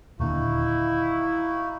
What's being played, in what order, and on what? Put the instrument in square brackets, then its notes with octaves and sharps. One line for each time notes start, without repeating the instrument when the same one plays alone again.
[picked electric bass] D#1 A#2 D3 [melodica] A#3 D#4 F#4 [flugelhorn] E4